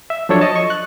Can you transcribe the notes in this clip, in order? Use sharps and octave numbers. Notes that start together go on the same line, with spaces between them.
E5
F3 F#3 D4 A4 C#5
D#5 A5
C#6
F#6